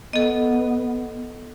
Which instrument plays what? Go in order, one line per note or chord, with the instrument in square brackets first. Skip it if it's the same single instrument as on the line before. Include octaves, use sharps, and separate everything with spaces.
[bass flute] B3 [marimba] A4 D#5